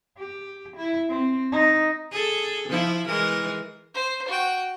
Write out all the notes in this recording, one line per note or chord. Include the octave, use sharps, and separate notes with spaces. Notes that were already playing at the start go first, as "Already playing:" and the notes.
G4
E4
C4
D#4
G#4 A4
F3 E4
E3 G#3 A#4
C5
F#4 G5